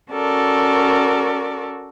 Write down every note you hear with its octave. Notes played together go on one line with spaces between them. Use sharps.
C#4 F#4 A4 A#4 D5